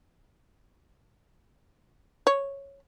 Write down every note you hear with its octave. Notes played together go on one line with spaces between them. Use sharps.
C#5